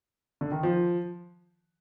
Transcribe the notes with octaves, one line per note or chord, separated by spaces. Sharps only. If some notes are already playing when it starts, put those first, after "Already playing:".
D3
D#3
F3